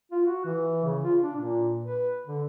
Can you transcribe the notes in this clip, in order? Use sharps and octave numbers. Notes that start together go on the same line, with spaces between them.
F4
F#4
E3
C#3
F4
D4
A#2
B4
D3